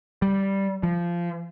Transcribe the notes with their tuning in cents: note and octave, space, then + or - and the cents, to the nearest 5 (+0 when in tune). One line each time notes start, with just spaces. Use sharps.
G3 -5
F3 -15